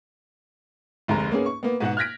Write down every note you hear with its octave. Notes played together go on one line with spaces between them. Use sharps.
F1 D2 G#3 A#5
A#3 B3 C#4 G#4
C#6
A#3 B3
G#2 B2 F#4 F#5
F6 F#6 G#6 A#6 B6 D7